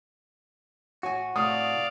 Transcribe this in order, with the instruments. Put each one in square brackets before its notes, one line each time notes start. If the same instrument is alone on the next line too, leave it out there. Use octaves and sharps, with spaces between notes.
[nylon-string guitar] A2 C#5 G#5 [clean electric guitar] F#4
[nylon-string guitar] A2 C3 A3 [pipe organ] D5 F5 [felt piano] D#6